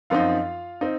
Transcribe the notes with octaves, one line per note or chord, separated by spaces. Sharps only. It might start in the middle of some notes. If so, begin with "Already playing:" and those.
F#2 F3 C4 D#4 F4 F5
C4 D#4